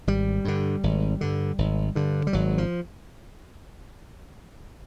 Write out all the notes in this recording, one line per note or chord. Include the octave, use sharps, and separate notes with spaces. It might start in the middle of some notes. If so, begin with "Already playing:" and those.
G#1 G3
G2 D3
G#1
G2 D3
G#1
G2 D3
G3
G#1 F#3
F3